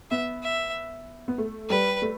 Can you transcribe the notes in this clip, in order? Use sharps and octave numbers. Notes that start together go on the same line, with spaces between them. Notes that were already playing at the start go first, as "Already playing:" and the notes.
B3 E5
E5
B3
A3
G3 B4
A3